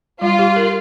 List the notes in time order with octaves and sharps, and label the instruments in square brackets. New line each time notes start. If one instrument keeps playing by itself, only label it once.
[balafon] G3 [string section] F4
[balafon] G4
A#4